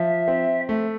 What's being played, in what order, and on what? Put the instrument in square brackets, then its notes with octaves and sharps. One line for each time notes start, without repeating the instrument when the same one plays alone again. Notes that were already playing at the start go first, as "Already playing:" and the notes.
Already playing: [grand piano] F3 [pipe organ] E5
[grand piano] C4
A3